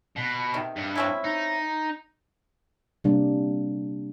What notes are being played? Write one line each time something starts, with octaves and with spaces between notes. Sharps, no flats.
B2
C3 D#3
G2
C4 C#4 E4
D#4
C3 G3 A#3 D4